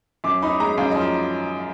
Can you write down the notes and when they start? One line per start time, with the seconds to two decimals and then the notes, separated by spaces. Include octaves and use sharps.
0.24 F#2 D6
0.42 D#4 B5
0.60 G#3 A#5
0.78 F#2 F5
0.91 F3 D#5